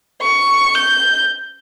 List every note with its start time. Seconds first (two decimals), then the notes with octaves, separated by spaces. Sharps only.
0.22 C#6
0.75 G6